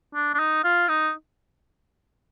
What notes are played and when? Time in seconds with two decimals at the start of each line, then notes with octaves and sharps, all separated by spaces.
0.15 D4
0.34 D4
0.39 D#4
0.64 F4
0.88 D#4